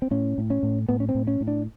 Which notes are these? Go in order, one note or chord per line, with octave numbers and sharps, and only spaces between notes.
C4
A2 C#4
A2
C#4
A2
A2 B3
C#4
C4
A2
C#4
A2
D4